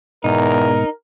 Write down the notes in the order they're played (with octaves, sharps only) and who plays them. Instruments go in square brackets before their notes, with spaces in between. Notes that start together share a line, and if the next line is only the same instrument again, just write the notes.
[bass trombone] E2 [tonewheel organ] G#2 B2 [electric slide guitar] D#4 [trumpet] A#4